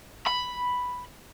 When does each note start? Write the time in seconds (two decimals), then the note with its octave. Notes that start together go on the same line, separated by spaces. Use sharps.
0.27 B5